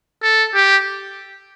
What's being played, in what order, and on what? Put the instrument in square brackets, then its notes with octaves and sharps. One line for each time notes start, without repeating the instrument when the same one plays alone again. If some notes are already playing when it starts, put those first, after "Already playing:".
[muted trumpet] A4
G4